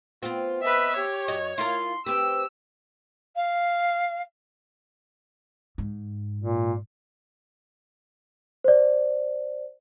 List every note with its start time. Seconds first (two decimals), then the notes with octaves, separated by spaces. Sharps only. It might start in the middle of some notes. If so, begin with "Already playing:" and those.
0.23 B3 C4 F4
0.62 B4 D#5 E5
0.96 G4 C#5
1.28 F#2 F#4 D#5
1.58 E4 F4 A#4 C6
2.06 C4 G4 B4 E6
3.36 F5
5.78 G#2
6.39 A#2
8.64 C5 D5